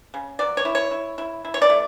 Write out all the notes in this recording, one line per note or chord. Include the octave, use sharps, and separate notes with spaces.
C#3
F#3 D5
C#5
E4
C#5
E4
E4
E4
C#5
D5
A3